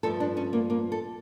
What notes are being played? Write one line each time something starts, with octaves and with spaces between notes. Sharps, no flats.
G2 F3 A3 A4
D4
C#4
A#3
A#3
A4